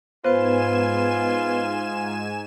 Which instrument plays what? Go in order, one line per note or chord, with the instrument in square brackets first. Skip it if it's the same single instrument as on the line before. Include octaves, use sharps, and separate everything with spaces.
[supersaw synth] G#2 G#5 E7 [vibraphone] B3 B4 [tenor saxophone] F4 [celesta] C5